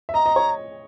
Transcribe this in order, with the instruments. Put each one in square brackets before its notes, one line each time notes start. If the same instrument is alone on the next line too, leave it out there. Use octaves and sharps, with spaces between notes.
[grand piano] E5
[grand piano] D#5 [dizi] A#5
[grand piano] D#5
C#5